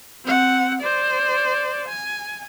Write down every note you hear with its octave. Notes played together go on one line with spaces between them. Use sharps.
C4 F#5
C5 D5
G#5